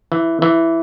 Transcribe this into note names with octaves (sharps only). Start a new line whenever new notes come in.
E3
E3